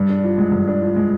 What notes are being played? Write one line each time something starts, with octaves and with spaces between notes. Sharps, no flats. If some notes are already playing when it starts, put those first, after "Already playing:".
Already playing: G2
D4
F3
G#3
G2
D4
F3
G#3